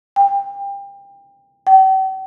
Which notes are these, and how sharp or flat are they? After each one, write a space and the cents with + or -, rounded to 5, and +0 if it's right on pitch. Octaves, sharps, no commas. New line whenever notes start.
G5 +25
G5 -45